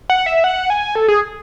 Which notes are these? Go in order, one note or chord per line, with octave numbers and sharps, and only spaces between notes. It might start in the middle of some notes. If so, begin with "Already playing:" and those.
F#5
E5
F#5
G#5
A4
G#4